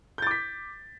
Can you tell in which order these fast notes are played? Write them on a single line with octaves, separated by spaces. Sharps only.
G6 A6 D6 B6